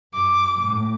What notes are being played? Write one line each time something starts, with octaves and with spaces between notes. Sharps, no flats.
F#2 D6
A2